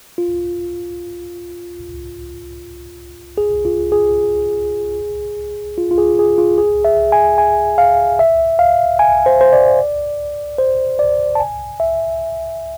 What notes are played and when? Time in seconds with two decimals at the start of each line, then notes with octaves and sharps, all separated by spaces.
0.18 F4
3.38 G#4
3.65 F4
3.92 G#4
5.78 F4
5.91 F4
5.98 G#4
6.19 G#4
6.38 F4
6.58 G#4
6.85 E5
7.12 G#5
7.38 G#5
7.78 F5
8.19 E5
8.59 F5
8.99 G#5
9.26 C5
9.41 C5
9.53 D5
10.58 C5
10.99 D5
11.35 A5
11.40 G#5
11.80 E5